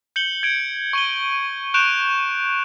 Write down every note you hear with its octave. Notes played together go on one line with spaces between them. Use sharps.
G6 C#7 F#7 G7
G#6 D7
C#6 D#7 G7
C#6 F#6 G6 D7 E7 F7